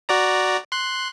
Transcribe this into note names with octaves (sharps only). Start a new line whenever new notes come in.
F#4 D5 A#5
C6 F#6